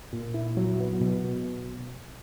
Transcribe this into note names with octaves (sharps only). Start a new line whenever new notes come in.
A#2
E4
F#3
B3
B2
B2